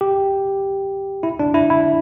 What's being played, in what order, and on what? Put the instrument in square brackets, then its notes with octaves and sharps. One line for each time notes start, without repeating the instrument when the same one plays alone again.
[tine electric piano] G4
E4
D4
E4
E4